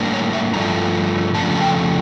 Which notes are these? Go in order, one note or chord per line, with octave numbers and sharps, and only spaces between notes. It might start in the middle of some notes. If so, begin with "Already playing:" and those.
Already playing: A2 G3 A#3 D4
C#5
E5
G2 F3 A3 D4 A#5
F2 C#3 F3 A3 D4 A5
A5
G5